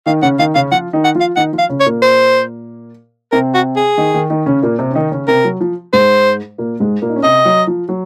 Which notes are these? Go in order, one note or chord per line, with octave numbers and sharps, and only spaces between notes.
D#3 D#4 F5
C#3 C#4 F#5
D#3 D#4 F5
C#3 C#4 F5
F3 F4 F#5
D#3 D#4
F#5
F3 F4
F5
D#3 D#4 F#5
F3 F4
F5
C#3 C#4
C#5
A#2 A#3
C5
C3 C4 A#4
F#4
G#4
D#3 D#4
D#3 D#4
D#3 D#4
C#3 C#4
A#2 A#3
C3 C4
C#4
D#3 D#4
C#3 C#4
C3 C4 A#4
F#3
F3
G#2 G#3 C5
A#2 A#3
G#2 G#3
A#2 A#3
D#4
C#4
C3 C4 D#5
F#3
F3
F#3